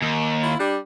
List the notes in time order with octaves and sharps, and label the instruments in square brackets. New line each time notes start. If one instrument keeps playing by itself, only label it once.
[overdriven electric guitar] D#2
[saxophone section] E4 F4
G3 D4